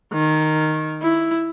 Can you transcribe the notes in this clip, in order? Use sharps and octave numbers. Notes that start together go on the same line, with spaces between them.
D#3
E4